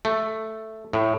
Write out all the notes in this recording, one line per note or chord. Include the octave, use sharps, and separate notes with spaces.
A3
A2